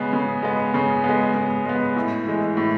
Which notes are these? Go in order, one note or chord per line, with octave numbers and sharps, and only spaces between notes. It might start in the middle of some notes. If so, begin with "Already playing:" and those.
Already playing: C#3 G#3 B3
C#3
G#3 B3
C#3
G#3 B3
C#3
G#3 B3
A2
E3 G#3
A2